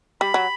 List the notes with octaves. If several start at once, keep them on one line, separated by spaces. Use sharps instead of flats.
G3 B5
F#3